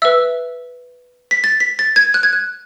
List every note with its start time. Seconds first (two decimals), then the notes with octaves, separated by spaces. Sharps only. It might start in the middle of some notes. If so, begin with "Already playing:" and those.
0.02 B4 E5 E6
1.31 B6
1.44 A6
1.60 B6
1.79 A6
1.96 G#6
2.14 F#6
2.23 G#6
2.33 F#6